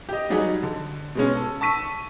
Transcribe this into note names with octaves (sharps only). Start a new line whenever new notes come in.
G4 D#5
F#3 G3 D#4 F#4 G#4
D3
B2 G#3 C#4
A4
A5 C#6 E6 B6 D#7